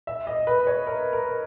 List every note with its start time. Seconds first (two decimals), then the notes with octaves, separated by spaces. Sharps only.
0.07 E5
0.27 D#5
0.47 B4
0.67 C#5
0.87 A#4
1.13 A#4